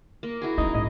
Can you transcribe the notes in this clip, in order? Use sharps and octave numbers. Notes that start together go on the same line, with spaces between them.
A#3
E4 F#4 G#4
C#4 D#4
G#2 D#5